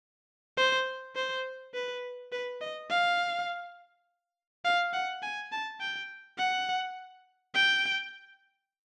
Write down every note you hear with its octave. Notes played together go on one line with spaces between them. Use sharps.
C5
C5
B4
B4
D#5
F5
F5
F#5
G#5
A5
G5
F#5
G5